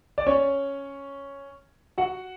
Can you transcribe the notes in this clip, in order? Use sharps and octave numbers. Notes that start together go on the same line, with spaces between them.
D5
C#4 C#5
F#4 F#5